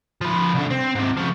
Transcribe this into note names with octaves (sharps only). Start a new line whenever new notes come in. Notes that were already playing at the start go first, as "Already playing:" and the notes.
F3 B4
C2 D3
C4
G#2 C3
C#3 F3